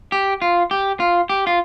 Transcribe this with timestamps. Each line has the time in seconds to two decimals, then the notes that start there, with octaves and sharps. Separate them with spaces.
0.12 G4
0.42 F4
0.71 G4
1.00 F4
1.30 G4
1.47 F4